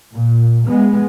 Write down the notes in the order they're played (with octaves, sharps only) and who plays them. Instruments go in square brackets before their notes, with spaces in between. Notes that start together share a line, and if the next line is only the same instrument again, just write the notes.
[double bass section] A#2
G#3 B3